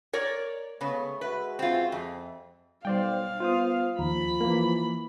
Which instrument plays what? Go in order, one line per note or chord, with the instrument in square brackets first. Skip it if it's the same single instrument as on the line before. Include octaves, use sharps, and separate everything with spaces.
[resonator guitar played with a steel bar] A#4 C#5 D5
[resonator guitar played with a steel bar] C#3 B3 [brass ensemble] G#3 A3 C#5
[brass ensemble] G#3 F#4 E5 [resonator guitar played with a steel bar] B4
[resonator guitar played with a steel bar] C4 F4
F2
[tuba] B1 [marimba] G3 [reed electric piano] C5 D5 G5 [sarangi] F5
[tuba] B3 [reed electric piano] F4 C5 D#6
[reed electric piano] D#2 [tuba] F3 [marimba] A#5 [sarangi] B5
[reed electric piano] E3 A#3 [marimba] F5